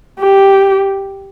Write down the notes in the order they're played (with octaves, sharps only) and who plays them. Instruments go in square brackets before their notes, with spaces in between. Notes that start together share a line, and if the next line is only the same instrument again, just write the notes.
[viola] G4